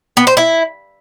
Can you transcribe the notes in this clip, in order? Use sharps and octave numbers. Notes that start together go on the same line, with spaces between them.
B3
C5
E4